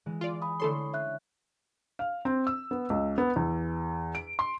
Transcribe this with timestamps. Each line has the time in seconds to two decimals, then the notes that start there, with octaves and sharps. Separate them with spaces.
0.06 E3 G#3
0.21 F4 D5
0.42 G#5 B5 D#6
0.60 D3 A3 E4 A4 C#5 C6
0.94 C#4 E5 F#6
1.99 F5
2.25 C4
2.47 E6
2.71 B3
2.90 C#2
3.18 B3
3.36 E2
4.15 D7
4.39 C6